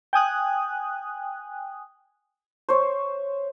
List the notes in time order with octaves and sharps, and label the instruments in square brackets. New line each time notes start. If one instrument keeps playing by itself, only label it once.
[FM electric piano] G5 G#5 D#6 F#6
[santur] C5 C#5